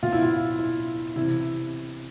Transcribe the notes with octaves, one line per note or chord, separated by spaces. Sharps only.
B2 F4
E4
F4
E4
C3 E3 E4